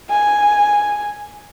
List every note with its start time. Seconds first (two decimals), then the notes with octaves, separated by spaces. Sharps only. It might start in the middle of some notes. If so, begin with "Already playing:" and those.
0.10 G#5